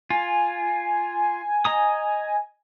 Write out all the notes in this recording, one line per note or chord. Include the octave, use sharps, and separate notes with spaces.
F4 G#5
D#5 A#5 D#6